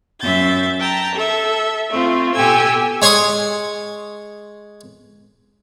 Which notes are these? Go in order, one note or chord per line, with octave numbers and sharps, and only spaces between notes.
F#2 E5 G6 A6
G5 A5 A#5
A4 E5
A3 C4 F4
B2 G4 A4 G#5 E6 G#6
G#3 C#5 C6 C#6 D#6